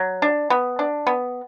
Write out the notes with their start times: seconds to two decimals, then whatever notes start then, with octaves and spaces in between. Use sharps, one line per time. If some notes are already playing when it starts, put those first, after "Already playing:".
Already playing: F#3
0.22 D4
0.50 B3
0.79 D4
1.07 B3